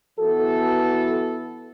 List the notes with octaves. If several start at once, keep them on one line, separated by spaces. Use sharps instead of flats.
E3 B3 F#4 A4